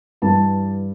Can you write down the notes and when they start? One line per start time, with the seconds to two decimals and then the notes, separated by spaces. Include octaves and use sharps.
0.22 G2 E3 G3 A5